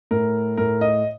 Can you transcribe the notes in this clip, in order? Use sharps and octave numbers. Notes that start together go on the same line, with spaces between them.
A2 A#4
A2 A#4
D#5